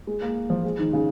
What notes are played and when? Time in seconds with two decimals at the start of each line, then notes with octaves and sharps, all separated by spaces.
0.07 G#3
0.22 A#3
0.50 F3
0.64 G#3
0.79 D#3
0.93 C#3